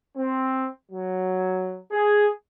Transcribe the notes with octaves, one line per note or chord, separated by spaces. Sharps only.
C4
F#3
G#4